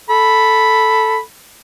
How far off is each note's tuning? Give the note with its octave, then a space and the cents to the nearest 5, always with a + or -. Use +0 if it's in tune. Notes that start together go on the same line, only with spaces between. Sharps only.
A4 +0 B5 +0